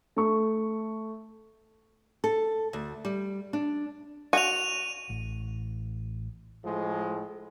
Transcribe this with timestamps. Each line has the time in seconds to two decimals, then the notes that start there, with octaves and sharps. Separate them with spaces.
0.16 A3 C#6
2.24 A4
2.73 D2
3.05 G3
3.53 D4
4.33 F#4 D#7 F7
5.10 A1
6.65 A2 F3 G#3